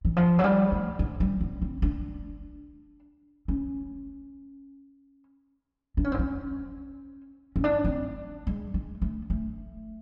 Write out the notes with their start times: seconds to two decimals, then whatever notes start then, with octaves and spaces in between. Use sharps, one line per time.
0.05 E3
0.17 F3
0.39 F#3
0.44 G3
0.72 A3
0.99 G#3
1.20 G3
1.41 B3
1.62 C4
1.82 D4
3.48 C#4
5.97 D4
6.05 C#4
6.12 C4
6.19 C#4
7.56 C#4
7.64 D4
7.84 C4
8.47 G#3
8.74 G#3
9.02 A3
9.30 A3